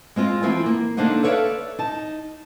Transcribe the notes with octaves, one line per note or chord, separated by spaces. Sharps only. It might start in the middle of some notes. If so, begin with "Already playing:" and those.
G#3 C4 F4 D#5
E3 F3 C4 E4 F#4 G#5
A#3
D3 A#3 D4 D#4 C5 F#5
A4 B4 C#5 D5 E5 F5
D#4 A5